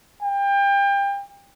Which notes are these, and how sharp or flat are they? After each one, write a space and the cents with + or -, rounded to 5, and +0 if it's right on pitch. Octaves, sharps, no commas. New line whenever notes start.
G5 +30